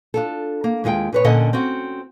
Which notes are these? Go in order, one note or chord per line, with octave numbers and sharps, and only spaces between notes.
D4 F4 A4
A#3
D#2 G#3 F4 F#5 G5
A#2 B4 C#5
A#2 D3 C#4 A4 D#5 F#5
C4 C#4 F#4